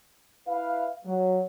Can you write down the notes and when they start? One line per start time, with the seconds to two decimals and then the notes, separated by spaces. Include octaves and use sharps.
0.47 E4 B4 F5
1.05 F#3